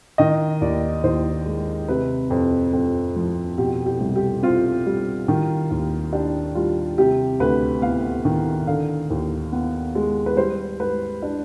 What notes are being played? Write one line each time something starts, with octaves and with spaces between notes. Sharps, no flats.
D#3 D#5
D#2 D5
D#2 C5
G#3
C3 B4
F2
F2
F3
B2 G4
G4
C2
G4
C4 F4
G3
D#3
D#2
D4 G4
G3 F4
C3 G4
D2 B4
B3 F5
D#3
D3 F5
D#2
B3
G#3
B4
G3 C5
G#2 B4
D4